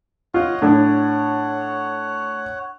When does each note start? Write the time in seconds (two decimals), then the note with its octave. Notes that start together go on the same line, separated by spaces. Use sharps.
0.34 F4 C#5 D#5 F#5
0.62 A2 D4 C#5 F#5